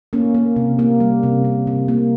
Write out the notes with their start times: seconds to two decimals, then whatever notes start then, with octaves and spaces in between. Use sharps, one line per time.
0.13 A#3 C#4
0.34 A#3
0.56 C3
0.79 A#3
1.00 G3
1.23 C3
1.44 C3
1.67 C3
1.88 A#3